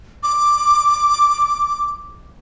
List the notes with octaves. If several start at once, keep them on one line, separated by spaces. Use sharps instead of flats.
D6